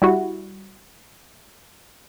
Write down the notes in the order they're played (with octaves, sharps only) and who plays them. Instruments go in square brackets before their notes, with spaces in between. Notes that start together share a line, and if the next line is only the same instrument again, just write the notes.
[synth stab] G3 E4 F#4